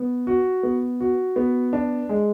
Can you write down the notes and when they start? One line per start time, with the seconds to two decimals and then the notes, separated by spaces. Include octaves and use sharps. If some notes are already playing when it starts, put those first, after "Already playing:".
Already playing: B3
0.27 F#4
0.63 B3
1.00 F#4
1.36 B3
1.73 D4
2.09 G#3